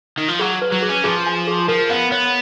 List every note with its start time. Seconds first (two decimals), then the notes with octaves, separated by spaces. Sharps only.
0.18 D#3
0.28 F3
0.39 F#3 G#4
0.62 B4
0.72 F#3
0.82 G#4
0.89 C#4
1.04 F3 G#4
1.26 G#5
1.47 G#4
1.68 F3 A#4
1.90 B3 F5
2.12 B3 C#5